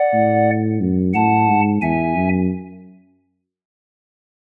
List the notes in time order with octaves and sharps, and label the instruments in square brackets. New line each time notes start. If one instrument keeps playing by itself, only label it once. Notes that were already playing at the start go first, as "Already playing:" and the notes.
Already playing: [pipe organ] D5 F#5
[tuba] A2
F#2
[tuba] A2 [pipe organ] F#5 A5
[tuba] G#2
[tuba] E2 [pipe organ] E5 G#5
[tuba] F#2